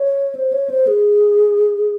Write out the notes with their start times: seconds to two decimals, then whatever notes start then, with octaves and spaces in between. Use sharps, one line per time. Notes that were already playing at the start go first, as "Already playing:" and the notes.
Already playing: C#5
0.35 C5
0.52 C#5
0.70 C5
0.87 G#4